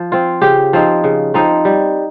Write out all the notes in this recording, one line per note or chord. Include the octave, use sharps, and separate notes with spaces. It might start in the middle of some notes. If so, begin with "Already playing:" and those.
Already playing: F3
C4 F4
C#3 G4
F3 C4 D#4
C#3
F3 C4 D#4
G3